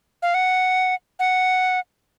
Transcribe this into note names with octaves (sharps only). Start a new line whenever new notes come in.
F5
F#5
F#5